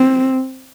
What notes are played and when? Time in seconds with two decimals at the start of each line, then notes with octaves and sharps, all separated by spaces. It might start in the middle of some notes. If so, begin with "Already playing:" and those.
Already playing: C4